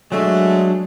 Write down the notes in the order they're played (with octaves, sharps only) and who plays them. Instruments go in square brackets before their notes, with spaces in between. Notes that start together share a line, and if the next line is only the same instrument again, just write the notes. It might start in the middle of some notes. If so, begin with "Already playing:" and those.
[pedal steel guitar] F#3 D4 [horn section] G#3 A3